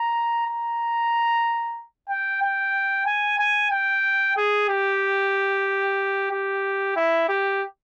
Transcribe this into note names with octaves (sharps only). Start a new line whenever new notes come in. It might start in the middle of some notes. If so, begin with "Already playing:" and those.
Already playing: A#5
A#5
G5
G5
G#5
G#5
G5
G#4
G4
G4
E4
G4